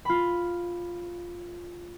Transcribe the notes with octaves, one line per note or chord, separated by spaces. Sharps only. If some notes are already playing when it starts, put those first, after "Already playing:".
F4 B5